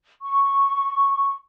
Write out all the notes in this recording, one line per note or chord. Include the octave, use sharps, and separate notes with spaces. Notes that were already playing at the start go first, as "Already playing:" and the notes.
C#6